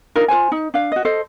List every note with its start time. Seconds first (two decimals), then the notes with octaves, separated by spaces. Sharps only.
0.16 D4 D#4 F4 A#4
0.28 F4 A#4 C5 G#5
0.52 D#4
0.74 D4 F5
0.92 F#4 D#5
1.05 A4 C5 D#5